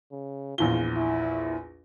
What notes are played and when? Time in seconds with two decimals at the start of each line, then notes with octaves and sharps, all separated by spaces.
0.11 C#3
0.58 A#1 E2 F4 G7
0.97 E4